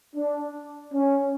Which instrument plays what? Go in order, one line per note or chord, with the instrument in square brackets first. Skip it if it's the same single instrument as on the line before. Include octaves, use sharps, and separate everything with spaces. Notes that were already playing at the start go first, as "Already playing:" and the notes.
[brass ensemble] D4
C#4